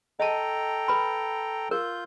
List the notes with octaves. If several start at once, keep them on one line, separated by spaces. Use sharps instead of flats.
A4 D#5 G5 A5 A#5
B4 B5
F4 A#4 G6